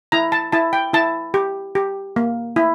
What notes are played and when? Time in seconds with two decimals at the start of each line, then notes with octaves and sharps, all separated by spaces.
0.12 E4 A#5
0.32 A5
0.52 E4 A5
0.73 G5
0.93 E4 A5
1.34 G4
1.75 G4
2.16 A#3
2.56 E4